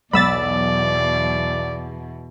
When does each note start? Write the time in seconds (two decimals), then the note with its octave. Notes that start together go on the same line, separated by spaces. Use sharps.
0.13 B1 E2 B2 D5 B5 E6 A6